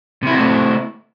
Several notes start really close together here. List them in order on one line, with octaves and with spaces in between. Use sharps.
C3 E4 F#4 C4 A3